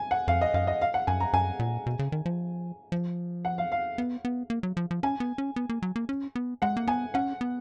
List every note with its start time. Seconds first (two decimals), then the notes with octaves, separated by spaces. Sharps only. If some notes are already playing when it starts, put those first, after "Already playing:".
Already playing: G#5
0.11 F#5
0.28 F2 F5
0.41 D#5
0.54 F#2 F5
0.67 D#5
0.81 F5
0.94 F#5
1.07 F#2 G#5
1.20 A#5
1.33 F#2 G#5
1.59 A#2
1.86 B2
1.99 C#3
2.12 D#3
2.26 F3
2.92 F3
3.45 F#5
3.58 F5
3.72 F5
3.98 B3
4.25 B3
4.50 A#3
4.63 F#3
4.77 F3
4.91 F3
5.03 C#4 G#5
5.20 B3
5.38 C#4
5.56 B3
5.69 A#3
5.82 F#3
5.96 A#3
6.09 C#4
6.36 B3
6.62 G#3 F#5
6.77 A#3
6.87 B3 G#5
7.14 C#4 F#5
7.41 B3